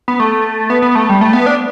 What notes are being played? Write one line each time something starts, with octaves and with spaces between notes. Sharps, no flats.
B3
A3
B3
B3
A3
G3
A3
B3
D4